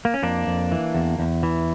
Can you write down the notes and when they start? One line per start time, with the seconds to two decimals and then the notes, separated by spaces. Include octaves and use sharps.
0.05 A#3
0.14 C#4
0.23 F2 A#3 D4
0.47 F2
0.72 E3
0.95 E2
1.19 E2
1.43 E3